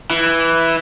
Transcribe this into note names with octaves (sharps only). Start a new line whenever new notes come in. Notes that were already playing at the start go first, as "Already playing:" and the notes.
E3